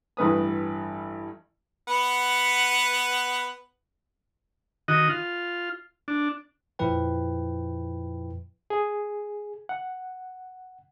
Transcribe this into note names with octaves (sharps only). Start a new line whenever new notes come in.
A1 G2 B4 D#6
B3 B4 F#5
D#3 F#4 D#5
F4
D4
F2 A#2 F3 E4 B4 G5
G#4
F#5